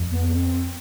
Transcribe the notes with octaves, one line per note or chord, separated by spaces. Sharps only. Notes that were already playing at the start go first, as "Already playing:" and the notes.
Already playing: F2
B3
C4